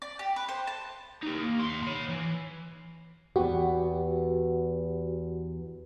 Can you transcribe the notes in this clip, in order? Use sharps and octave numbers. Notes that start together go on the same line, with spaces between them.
D5
G4
B4
C5
A5
D#4 G4
A#3
D#2 C6
C#5 B5
E3
E2 B3 F#4 G4